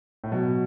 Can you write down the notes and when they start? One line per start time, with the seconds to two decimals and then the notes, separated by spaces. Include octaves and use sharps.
0.24 A2
0.32 B2 F#3